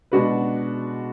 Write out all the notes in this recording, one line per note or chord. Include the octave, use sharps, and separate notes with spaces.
B2 G#3 D4 F#4 B4